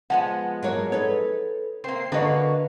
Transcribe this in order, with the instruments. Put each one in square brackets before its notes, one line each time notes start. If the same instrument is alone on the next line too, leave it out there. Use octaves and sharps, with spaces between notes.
[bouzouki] F3 G#3 B3 [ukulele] F#5
[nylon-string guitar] F#3 A#3 C#5
[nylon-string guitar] D#4 A4 B4 [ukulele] C#5
[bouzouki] A#3 C4 [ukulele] C5 [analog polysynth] C7
[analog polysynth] D3 [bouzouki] A#3 F#4 C#5 [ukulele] D4 D#5 [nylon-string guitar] B4